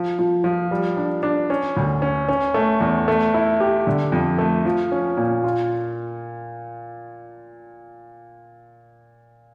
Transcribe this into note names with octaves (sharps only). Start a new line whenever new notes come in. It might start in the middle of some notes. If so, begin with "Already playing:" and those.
Already playing: F3
F3
F3
G3
D4
D4
C#4
D2
C#4
C#4
A3
E2
A3
E4
G4
D3
F2
A3
F3
C#4
A#2
F4